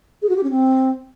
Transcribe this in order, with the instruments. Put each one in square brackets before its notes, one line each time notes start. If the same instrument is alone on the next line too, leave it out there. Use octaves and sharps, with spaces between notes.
[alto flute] G#4
F#4
G4
C#4
C4